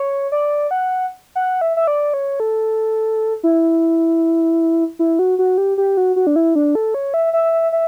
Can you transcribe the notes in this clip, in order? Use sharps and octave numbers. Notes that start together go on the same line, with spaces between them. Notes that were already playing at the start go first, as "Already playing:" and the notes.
Already playing: C#5
D5
F#5
F#5
E5
E5
D5
C#5
A4
E4
E4
F#4
F#4
G4
G4
F#4
F#4
D4
E4
D4
A4
C#5
E5
E5
E5